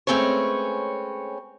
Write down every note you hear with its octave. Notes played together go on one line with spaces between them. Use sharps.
G#3 A3 C4 C#4 B4 C#5